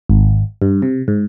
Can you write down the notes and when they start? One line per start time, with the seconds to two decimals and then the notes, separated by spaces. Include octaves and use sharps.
0.09 G#1
0.62 G2
0.82 C3
1.08 G#2